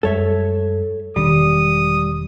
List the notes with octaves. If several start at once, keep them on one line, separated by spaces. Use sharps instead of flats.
F#2 G3 G#3 A4 C#5 E5
E1 D#3 G3 D4 D#6